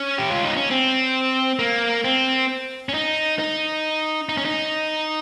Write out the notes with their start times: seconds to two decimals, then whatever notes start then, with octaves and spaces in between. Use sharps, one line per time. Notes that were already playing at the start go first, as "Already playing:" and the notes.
Already playing: C#4
0.18 G4
0.31 F4
0.44 D#4
0.57 C#4
0.71 C4
1.59 A#3
2.04 C4
2.89 C#4
2.94 D#4
3.39 D#4
4.29 D#4
4.37 C#4
4.45 D#4